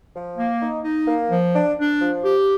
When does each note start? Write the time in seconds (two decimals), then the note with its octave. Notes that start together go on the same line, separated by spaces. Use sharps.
0.15 F3
0.38 A#3
0.62 D#4
0.84 D#4
1.07 A#3
1.31 F3
1.54 D4
1.78 D4
2.01 F3
2.24 G4